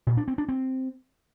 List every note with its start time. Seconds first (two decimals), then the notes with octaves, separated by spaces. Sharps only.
0.07 A#2
0.17 D4
0.28 C4
0.38 D4
0.49 C4